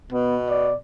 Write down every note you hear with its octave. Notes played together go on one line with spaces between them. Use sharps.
B2 B3
D5